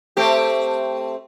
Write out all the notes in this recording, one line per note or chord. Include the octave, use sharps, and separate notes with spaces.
A3 C4 G4